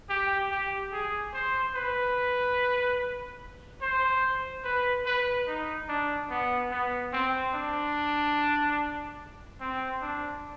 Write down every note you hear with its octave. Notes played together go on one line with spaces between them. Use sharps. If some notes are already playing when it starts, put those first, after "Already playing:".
G4
G4
G#4
C5
B4
C5
B4
B4
D#4
D4
B3
B3
C4
D4
C4
D4